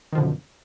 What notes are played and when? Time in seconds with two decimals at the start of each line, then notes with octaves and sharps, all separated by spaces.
0.12 D#3
0.15 F3
0.18 D3
0.20 B2
0.23 F#2